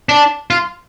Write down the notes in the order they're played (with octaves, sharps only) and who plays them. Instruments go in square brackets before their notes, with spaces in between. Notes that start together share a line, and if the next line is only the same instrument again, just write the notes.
[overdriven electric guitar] D4
F4